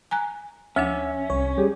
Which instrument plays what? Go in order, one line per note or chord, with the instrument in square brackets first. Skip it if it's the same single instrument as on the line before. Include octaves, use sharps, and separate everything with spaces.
[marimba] G#5 A#5 F#6
[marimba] D2 F3 D4 [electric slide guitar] C#4 [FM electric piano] E5
[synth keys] C2 [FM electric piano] C#5
[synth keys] G3 G4 G#4